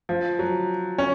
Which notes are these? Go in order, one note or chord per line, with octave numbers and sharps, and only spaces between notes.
F3
F#3
C#4